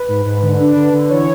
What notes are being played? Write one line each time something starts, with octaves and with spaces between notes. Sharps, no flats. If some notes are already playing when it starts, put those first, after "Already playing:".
Already playing: B4
G#2
G#2
D3
D4
D3
D3
E3 C#5